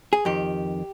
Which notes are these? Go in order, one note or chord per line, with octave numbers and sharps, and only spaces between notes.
G#4
F2 D#3 G4